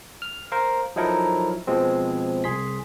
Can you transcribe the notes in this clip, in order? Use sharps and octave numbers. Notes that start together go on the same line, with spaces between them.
F6
A#4 C5 F5
F3 F#3 D#4 E4 A4 A#4
B2 F3 G#3 C4
C2 G#4 C6 B6